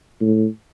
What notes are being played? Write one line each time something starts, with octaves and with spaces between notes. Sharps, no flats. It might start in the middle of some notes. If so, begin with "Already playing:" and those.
A2